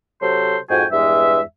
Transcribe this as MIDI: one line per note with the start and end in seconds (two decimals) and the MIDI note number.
0.22 0.57 48
0.22 0.57 54
0.22 0.57 69
0.22 0.57 72
0.22 0.57 84
0.70 0.85 41
0.70 0.85 44
0.70 0.85 66
0.70 0.85 79
0.70 0.85 80
0.92 1.41 40
0.92 1.41 43
0.92 1.41 56
0.92 1.41 76